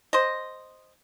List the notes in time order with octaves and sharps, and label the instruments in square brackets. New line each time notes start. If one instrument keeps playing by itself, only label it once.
[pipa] C5 D#5